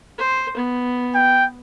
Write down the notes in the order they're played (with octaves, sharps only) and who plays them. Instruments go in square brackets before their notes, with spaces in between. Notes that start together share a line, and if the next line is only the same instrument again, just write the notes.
[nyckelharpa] C5
B3
[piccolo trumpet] G5